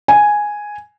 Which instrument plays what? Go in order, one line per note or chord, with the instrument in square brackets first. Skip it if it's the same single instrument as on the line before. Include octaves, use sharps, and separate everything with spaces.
[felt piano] G#5